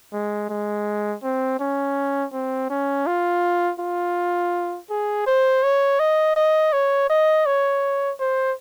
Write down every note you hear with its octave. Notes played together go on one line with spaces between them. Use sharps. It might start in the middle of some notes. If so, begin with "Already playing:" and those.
G#3
G#3
C4
C#4
C4
C#4
F4
F4
G#4
C5
C#5
D#5
D#5
C#5
D#5
C#5
C5